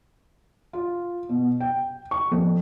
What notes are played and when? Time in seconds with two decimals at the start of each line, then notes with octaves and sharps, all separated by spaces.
0.73 F4
1.29 B2
1.60 G5
2.11 C#6
2.32 F2